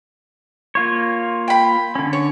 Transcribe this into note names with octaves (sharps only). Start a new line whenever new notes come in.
A#3 F4 C#5
G5 B5
D3 C#4
C#5